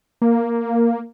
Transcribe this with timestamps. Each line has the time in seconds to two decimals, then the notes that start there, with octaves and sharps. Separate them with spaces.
0.22 A#3